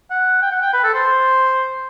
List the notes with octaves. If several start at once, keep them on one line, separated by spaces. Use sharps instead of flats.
F#5
G5
F#5
G5
B4
A4
C5